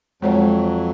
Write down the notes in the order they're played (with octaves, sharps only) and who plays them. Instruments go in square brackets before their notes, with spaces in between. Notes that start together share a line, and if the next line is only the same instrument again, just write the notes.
[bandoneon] F2 F#3 [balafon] G#3 C5 C#5